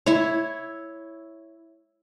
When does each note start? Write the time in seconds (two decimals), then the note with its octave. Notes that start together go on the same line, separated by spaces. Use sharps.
0.06 E4 C#5